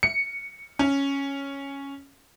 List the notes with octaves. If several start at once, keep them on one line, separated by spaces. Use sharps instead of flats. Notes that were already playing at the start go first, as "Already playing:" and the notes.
C#7
C#4